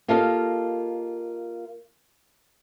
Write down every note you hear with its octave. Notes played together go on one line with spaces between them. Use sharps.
A#3 F4 G4 A4 D#5 F5